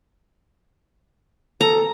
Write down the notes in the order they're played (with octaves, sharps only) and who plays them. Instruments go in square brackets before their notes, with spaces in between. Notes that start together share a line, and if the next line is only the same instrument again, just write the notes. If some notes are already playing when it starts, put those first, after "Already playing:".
[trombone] A4 [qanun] A#5